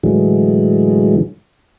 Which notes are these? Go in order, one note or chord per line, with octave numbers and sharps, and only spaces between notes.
A2 D3 E3 F#3 G#3